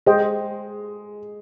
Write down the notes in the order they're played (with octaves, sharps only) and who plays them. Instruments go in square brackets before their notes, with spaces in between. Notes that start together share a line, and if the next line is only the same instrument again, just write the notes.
[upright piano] G#3 [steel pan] C5 D#5 G5